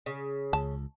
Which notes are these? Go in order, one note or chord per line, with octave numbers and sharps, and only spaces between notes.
C#3
C#2 A5